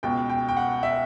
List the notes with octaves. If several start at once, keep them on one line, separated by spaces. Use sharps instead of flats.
C#2 B2 G5
G5
G5
F#5
E5